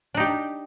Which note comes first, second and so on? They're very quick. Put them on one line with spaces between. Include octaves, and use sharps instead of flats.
D4 D#4 G4